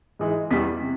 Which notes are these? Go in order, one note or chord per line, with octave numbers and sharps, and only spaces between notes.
G#2 E3 G#3
E2 B2 G3 B6
C3